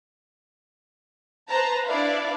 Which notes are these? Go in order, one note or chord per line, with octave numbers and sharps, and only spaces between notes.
B4 C5 A5 A#5
D4 E4 B4 D5 E5 F5